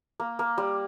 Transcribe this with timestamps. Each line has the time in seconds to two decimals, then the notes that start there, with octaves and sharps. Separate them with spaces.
0.20 A#3
0.39 A#3
0.58 G3